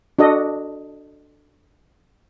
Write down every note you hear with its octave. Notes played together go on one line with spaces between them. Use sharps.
D4 F#4 A4 D#5